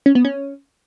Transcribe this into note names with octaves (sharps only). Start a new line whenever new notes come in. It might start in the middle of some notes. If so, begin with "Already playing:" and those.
C#4
B3
C#4